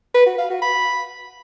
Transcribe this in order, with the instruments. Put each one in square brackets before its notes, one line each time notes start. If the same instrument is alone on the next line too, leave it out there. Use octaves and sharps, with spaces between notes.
[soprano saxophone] B4
F#4
F5
F#4
B5